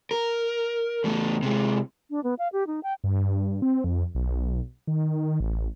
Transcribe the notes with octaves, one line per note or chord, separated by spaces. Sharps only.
A#4
E2 A3
C3 G#3
D4
B3
F5
G4
D#4
G5
G2
C4
F2
B1
D#3
A1